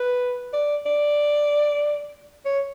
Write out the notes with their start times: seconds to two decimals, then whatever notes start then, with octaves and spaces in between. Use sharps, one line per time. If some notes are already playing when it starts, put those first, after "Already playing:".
Already playing: B4
0.53 D5
0.86 D5
2.45 C#5